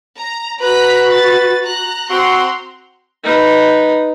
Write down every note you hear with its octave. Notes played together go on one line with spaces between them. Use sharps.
A#5
F#4 B4 A#5 F#6 B6
A6
A#5 F#6
C4 F#4 A#5 C6
D#4 B4